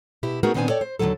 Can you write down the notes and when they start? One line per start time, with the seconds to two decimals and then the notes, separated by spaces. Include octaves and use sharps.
0.23 B2 E4 G4
0.43 A3 B3 D#4 F#4 G#4 A#4
0.54 A#2 D#3 B3 C4 D4 G#5
0.68 A4 C#5 D5 G5
0.81 C5
0.99 D#2 D3 E3 F#3 A4